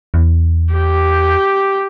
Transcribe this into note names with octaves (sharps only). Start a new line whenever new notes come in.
E2
G4